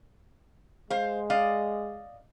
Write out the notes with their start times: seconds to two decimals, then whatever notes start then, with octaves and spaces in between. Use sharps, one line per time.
0.90 G#3 C5 F5
1.30 D5 D#5 F5